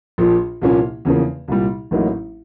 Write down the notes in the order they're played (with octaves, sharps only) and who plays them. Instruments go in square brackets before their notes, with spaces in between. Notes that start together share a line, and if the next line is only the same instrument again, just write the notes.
[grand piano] A#1 A#2 F3
C2 A#2 F3 A#3 C#4
E2 C#3 F3 A#3
C2 A#2 G3
A1 A2 F#3 A#3 D#4